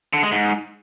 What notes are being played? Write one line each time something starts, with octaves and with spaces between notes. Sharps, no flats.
D3
G#3
G#2